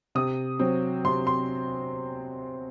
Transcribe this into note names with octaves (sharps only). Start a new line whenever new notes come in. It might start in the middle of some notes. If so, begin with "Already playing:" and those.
C3 D#6
F#3 C4
C3 C6
C6